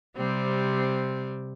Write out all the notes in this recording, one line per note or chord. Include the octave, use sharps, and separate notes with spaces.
C3 G3 C4